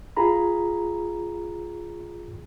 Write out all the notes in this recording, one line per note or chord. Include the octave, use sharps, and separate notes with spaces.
F4 G#4 A#5 B5